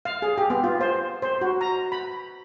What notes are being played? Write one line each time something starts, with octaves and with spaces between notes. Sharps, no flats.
F5
G#4
G4
B3
F4
C5
C5
F#4
A#5
B5